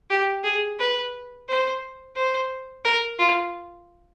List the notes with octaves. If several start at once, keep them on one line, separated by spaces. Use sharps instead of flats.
G4
G#4
B4
C5
C5
A#4
F4